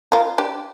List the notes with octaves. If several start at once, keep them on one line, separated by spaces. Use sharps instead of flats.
F4 A#4
D4 G4